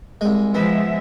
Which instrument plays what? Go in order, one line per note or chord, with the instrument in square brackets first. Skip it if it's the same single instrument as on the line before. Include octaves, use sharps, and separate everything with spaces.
[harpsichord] C2 G#3
[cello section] F3 G#3 E5 [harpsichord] B3